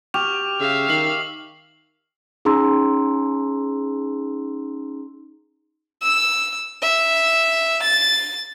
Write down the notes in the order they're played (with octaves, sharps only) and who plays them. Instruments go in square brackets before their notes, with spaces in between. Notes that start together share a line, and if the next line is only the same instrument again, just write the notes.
[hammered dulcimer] G4 [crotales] C#6 F6 F7
[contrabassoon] C#3 [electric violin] E5 F5
[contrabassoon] D#3 [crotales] C7 F#7
[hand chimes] C#4 D#4 G#4 A#5 C6 E6
[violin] E6
E5
A6